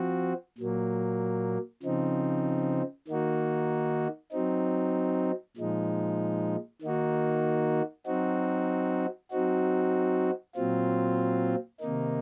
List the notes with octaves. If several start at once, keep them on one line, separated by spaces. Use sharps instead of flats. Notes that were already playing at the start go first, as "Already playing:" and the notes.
Already playing: F3 C4 F#4
A#2 F#3 A#3
C#3 F3 C4 D#4
D#3 A#3 D#4 F#4
F#3 C4 D#4
A#2 F3 G#3 D#4
D#3 A#3 D#4 F#4
F#3 C4 D#4 F#4
F#3 C4 D#4 F#4
A#2 F#3 C4 F4
C3 D#3 A#3 D#4